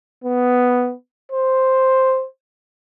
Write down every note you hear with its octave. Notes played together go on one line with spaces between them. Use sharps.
B3
C5